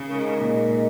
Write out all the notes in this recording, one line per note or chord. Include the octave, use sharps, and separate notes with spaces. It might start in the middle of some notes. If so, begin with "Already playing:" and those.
Already playing: C#3
G#3 D#4 A#4
A#2